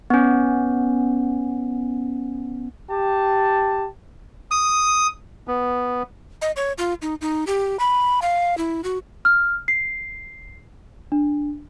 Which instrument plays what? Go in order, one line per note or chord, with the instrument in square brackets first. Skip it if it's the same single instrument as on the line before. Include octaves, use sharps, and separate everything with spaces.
[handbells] B3 C#4
[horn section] G4 A5
[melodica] D#6
[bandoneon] B3
[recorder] D#5
C#5
F4
D#4
D#4
G4
B5
F5
E4
F#4
[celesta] F6
C7
D4